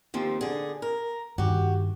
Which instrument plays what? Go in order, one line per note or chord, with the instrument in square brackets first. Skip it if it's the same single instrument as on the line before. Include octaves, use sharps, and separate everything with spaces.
[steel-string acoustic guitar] D#2 F3 C4
D3 G#4
A#4
[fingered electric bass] G2 D#3 [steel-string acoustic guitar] F#4 G4